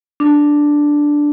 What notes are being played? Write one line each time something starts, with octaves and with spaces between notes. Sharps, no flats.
D4